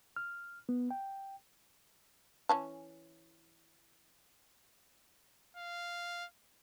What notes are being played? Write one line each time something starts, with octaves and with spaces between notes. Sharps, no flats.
F6
B3
G5
E3 C#4 A5
F5